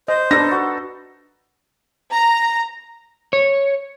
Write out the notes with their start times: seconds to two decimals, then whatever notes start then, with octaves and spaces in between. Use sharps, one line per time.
0.08 C5 D#5
0.31 D4 D#4 A4 B4 A#6
0.51 F#4
2.12 A#5
3.33 C#5